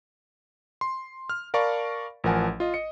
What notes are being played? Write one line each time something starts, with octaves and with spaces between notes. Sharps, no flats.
C6
F6
A#4 D5 F5 A5 B5 C#6
A1 F3 A#4 F#5 G#5 A5
F4 D#5
D#5 C#7